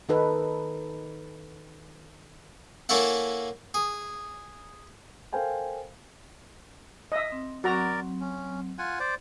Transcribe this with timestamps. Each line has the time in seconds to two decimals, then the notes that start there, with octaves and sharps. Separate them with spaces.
0.09 D#3 D#4 A4 B4
2.89 A#3 C#4 E4 A4 E5 F#5
3.74 G#4
5.33 A4 A#4 C5 F5 G5 G#5
7.12 D#5 E5
7.32 C4
7.64 F#3 C4 F#4 A#4 D5 A#5
8.21 C#4
8.78 F4 F#5 G#5
9.00 C5 D5